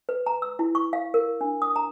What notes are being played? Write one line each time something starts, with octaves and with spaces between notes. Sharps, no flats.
B4
A#5
E6
E4
C#6
F5
A#4
D4
D#6
A#5